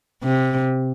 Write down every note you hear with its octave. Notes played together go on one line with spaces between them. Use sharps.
C3